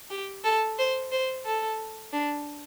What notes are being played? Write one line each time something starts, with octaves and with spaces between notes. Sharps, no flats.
G4
A4
C5
C5
A4
D4